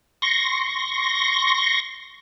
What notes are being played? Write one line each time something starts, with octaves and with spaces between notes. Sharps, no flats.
C6 C#6 A#6